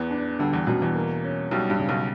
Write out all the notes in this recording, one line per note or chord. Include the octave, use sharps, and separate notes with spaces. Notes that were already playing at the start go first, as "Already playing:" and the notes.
Already playing: E2 E3 B3
D4
D2 D3 G3
E2 E3
F#2 B2 F#3
E2 E3
A#3
C#4
B1 B2 G3
G2
C#3
B1 B2